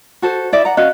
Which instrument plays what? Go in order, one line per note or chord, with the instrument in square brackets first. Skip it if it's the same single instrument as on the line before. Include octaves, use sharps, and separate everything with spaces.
[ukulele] F#4 A4 C5
E4 D5 E5
F#5 A#5
[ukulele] C#4 F#4 F5 [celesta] D#5 F#6